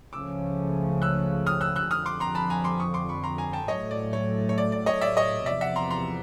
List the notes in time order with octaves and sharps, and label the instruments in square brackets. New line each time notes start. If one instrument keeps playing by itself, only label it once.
[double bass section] C#2 C#3 F3 A3 C#4 [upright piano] D6 E6
[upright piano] E6 F#6
D#6 F6
E6 F#6
E6 F#6
[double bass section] F2 D3 F3 [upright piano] D#6 F6
[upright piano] C6 D6
A#5 C6
A5 B5
G#5 A#5
C6 D6
C#6 D#6
C6 D6
B5 C#6
A#5 C6
G#5 A#5
G5 A5
[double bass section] A2 F#3 A3 [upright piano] C#5 D#5
[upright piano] D5
C#5
C#5
D5
D5
C#5 D#5
D5 E5
C#5 D#5
[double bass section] E2 C3 F3 [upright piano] D5 E5
[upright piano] E5 F#5
A#5 C6
A#5 C6